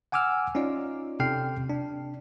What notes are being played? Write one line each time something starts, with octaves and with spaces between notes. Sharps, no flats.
F#5 G#5 D6 E6 F6
C#4 D#4 F4 D5
C3 A4 G5 F6 C7
D4